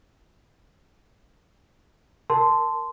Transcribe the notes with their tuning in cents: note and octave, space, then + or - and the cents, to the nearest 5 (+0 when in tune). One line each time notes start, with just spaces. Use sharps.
A#4 +0 A5 +0 C6 -15